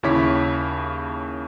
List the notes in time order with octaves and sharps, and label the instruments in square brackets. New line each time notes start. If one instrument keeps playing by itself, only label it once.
[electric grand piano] D#2 C#3 E4 C#5 D6 B6